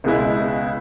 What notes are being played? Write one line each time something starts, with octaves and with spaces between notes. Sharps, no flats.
C#2 B2 G#3 B3 E4